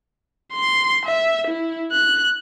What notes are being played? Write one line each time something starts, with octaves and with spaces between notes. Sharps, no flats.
C6
E5
E4
F#6